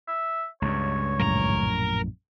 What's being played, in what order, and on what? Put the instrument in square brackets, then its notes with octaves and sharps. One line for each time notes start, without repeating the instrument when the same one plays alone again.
[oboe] E5
[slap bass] C#2 G2 [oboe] C#5
[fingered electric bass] A#1 F#2 A2 [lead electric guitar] A#4 A#5